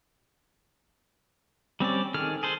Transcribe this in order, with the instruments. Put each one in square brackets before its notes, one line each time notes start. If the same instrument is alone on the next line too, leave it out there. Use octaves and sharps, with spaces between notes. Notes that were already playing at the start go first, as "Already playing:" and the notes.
[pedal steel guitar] G3 C4 C#4 D5
D#3 G#4 A4 F6
G#4 A4 C5